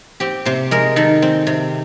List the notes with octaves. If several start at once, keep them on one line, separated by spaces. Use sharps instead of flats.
C4 G4
C3 C5
G#3 A#4
D#3 A4
C4
C3